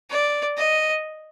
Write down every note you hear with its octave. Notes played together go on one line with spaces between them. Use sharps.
D5
D#5